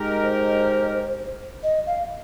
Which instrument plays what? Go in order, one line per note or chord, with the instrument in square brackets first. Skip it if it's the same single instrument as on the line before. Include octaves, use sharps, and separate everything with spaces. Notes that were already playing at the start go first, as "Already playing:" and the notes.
Already playing: [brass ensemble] G#3 D#4 G4 A#4
[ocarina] C5
D#5
F5